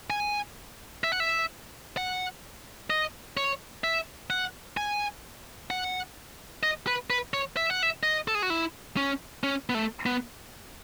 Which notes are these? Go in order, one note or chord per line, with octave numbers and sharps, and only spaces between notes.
G#5
E5
F#5
E5
F#5
D#5
C#5
E5
F#5
G#5
F#5
D#5
B4
B4
C#5
E5
F#5
E5
D#5
A4
G#4
F#4
E4
C#4
C#4
B3
A3
B3